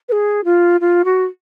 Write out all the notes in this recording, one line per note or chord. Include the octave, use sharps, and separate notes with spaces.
B4
G#4
F4
F4
F#4